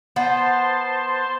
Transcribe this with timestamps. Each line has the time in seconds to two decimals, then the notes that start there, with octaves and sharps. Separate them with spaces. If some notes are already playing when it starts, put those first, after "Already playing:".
0.16 B3 C5 A5 C6